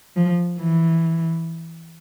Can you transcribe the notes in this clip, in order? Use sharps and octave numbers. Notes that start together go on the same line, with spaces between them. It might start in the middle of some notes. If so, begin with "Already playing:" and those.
F3
E3